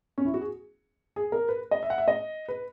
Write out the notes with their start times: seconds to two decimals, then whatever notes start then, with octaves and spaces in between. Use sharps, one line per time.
0.18 C#4
0.25 E4
0.34 F#4
0.41 G#4
1.16 G#4
1.32 A#4
1.49 B4
1.71 D#5
1.83 E5
1.90 F#5
1.98 E5
2.08 D#5
2.48 B4